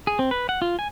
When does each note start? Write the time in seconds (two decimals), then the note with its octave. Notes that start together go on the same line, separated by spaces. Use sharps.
0.07 G#4
0.19 C4
0.31 B4
0.49 F#5
0.62 F4
0.79 G#5